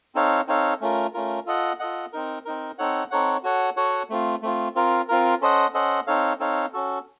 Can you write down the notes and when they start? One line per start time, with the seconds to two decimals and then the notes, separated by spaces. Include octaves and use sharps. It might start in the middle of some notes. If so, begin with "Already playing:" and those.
0.15 C4 D#4 A4 C#5 F5
0.47 C4 D#4 A4 C#5 F5
0.81 A3 C#4 F4 A#4
1.14 A3 C#4 F4 A#4
1.46 F4 A4 D#5 F#5
1.79 F4 A4 D#5 F#5
2.12 C4 D#4 A#4
2.45 C4 D#4 A#4
2.78 C4 D#4 A4 C#5 F#5
3.11 C4 D#4 A4 C#5 F#5
3.43 F#4 A4 C#5 F#5
3.76 F#4 A4 C#5 F#5
4.10 A3 C4 F4
4.42 A3 C4 F4
4.75 C4 F4 A#4
5.08 C4 F4 A#4
5.41 C#4 A4 C5 D#5 F#5
5.74 C#4 A4 C5 D#5 F#5
6.07 C4 D#4 A4 C#5 F5
6.39 C4 D#4 A4 C#5 F5
6.73 C#4 F#4 A4